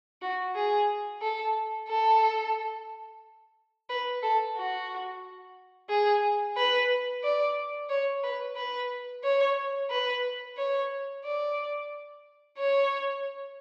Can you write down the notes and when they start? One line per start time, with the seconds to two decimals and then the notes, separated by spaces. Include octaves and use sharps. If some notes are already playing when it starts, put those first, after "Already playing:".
0.22 F#4
0.55 G#4
1.21 A4
1.88 A4
3.89 B4
4.23 A4
4.56 F#4
5.89 G#4
6.57 B4
7.23 D5
7.89 C#5
8.23 B4
8.56 B4
9.24 C#5
9.90 B4
10.57 C#5
11.25 D5
12.58 C#5